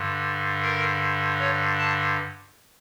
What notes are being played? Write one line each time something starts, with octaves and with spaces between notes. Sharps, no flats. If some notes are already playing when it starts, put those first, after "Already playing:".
Already playing: G2 D3
A#4
C#5
A5